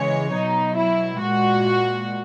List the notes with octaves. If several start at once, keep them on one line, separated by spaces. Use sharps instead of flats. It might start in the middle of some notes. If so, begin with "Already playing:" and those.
Already playing: C#3 E3 G#3 C#5
B2 F#3 D#4
E4
A#2 G#3 F#4